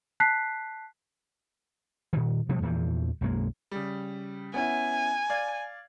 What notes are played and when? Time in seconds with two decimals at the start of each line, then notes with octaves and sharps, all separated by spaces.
0.20 A5 F#6 B6 C7
2.13 A#2 D#3
2.49 B2 F3 G3 A3
2.62 E2 A#2 E3 F3
3.21 B1 F#2 G#3 A#3
3.71 C#3 G3
4.54 B3 C#4 E4 G#5
5.30 D5 F5 G#6